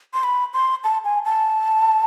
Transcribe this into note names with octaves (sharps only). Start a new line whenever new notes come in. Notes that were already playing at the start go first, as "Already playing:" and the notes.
C6
B5
C6
A5
G#5
A5